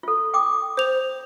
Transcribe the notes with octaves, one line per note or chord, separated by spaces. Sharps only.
F4 A4
G5 D6 D#6
C5 F7